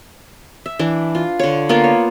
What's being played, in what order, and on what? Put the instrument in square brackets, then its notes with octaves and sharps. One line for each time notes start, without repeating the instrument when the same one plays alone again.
[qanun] E5
E3 D4
F4
D3 C#5
A#3 B3 F4
C#5